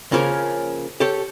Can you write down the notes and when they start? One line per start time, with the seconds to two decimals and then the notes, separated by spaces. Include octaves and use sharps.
0.12 C#3 F3 A#3 C#4 A#4
1.00 G4 A4 C#5